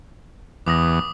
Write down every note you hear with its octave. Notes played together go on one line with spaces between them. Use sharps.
E2 D6 D#6 A#6